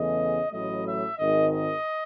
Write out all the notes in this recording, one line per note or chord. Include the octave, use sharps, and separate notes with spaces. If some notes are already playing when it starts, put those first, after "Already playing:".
Already playing: E2 C#3 E3 A3 D#5
A1 A2 F#3 A3 D#5
E5
G#1 G#2 D#3 D#5
D#5